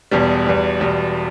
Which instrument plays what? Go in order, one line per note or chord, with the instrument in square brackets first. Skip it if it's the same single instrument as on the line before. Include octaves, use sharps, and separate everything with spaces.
[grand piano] E1 E2 B2 G3
E1 E2 B2 G3
E1 E2 B2 G3